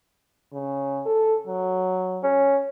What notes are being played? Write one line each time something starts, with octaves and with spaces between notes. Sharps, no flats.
C#3
A4
F#3
C#4